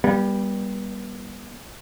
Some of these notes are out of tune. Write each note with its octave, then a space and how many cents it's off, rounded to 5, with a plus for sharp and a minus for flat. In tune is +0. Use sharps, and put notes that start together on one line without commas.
G3 +10 B3 -40